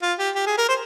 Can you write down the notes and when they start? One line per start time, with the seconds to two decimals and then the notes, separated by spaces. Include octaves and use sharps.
0.02 F4
0.19 G4
0.35 G4
0.46 G#4
0.57 A#4
0.68 C5